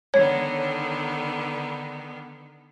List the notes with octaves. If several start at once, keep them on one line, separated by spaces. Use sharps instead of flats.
D3 D#3 B3 C#5